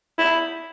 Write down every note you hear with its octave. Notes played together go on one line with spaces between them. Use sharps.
E4